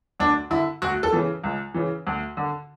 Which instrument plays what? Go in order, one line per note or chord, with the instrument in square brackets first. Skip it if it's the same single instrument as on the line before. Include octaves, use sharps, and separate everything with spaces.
[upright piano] D2 D4
D3 E4
D2 F#4
A4
C#3 E3
C#2
C#3 E3
D2
D3